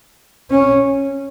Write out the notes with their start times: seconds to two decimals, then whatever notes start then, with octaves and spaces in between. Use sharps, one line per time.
0.51 C#4